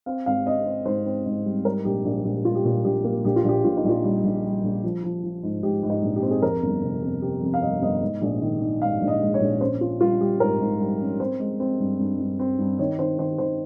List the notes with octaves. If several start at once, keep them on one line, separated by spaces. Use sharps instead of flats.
C4 F5
G#1 F5
C4 D#5
C4
G#2 C5
C4
G#2
G3
G3 A#4
A#1 G4
A#1
A#1 G4
G3 F4
G4
A#2 F4
A#1 G4
A#3
A#1 G4
F4
A#1 G4
A#1 F4
D#4
A#1
F4
G3
A#1
G3
A#1
F3
F3
F3
G#2
G#2 G4
G#2
D#4
A#1
G4
C4
G#4
F2 A#4
G1
C3
F2
C3 G4
F2
F5
G1 D#5
G1 D#5
G#2
A#1
D#3
D#3
G#2 F5
A#1
D#5
G#3
C#5
A#1
C#4 C5
C#4 F4
G3 F4
G3 G4
G#2 A#4
G#2
G3
C#4
C4 C5
G#3
C4
G2
G2
G2
C4
G2
D#3 C#5
D#3 C5
D#3 C5
D#3 C5